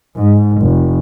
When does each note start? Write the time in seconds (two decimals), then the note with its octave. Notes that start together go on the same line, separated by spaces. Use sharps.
0.16 G#2
0.62 F1